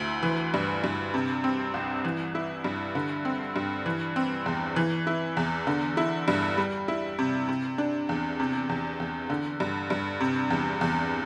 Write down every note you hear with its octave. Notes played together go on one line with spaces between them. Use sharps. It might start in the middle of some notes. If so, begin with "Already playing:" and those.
Already playing: D2 E4
E3
G2
G2
C3
C4
C2
E3
E4
G2
D3
C4
G2
E3
C4
E2
E3
E4
E2
D3
E4
G2
G3
E4
C3
C3
D4
E2
C3
E2
E2
D3
G2
G2
C3
E2
E2